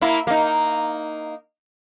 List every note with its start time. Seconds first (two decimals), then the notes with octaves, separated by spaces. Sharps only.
0.01 A#3 E4
0.27 A#3 D#4